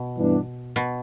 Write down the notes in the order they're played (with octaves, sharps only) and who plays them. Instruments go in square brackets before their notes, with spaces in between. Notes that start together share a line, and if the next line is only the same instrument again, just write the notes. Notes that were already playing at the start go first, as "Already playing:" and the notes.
Already playing: [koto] B2
[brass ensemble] G2 E3 B3 D4
[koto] B2